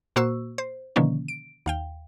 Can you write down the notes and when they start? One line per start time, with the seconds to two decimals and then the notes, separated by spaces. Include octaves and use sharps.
0.16 A#2 A#3 F#4 C5 C#6 E6
0.58 C5
0.96 B2 D3 D#3 F3 A#3 C#4
1.28 D7
1.66 D#2 F5 G5